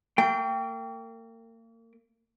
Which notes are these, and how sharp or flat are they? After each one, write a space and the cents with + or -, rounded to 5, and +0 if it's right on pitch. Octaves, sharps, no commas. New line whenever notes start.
A#3 -40 G5 +0